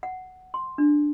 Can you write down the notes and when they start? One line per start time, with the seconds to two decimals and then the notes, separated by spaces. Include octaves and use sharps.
0.03 F#5
0.54 C6
0.78 D4